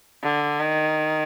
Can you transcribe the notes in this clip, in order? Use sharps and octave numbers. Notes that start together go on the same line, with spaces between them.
D3
D#3